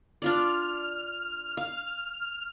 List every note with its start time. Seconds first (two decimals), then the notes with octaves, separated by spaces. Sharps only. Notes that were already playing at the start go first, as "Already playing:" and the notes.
0.22 D4 F4 D5 F6
1.57 F5